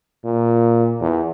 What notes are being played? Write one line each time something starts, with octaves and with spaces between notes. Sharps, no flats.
A#2
E2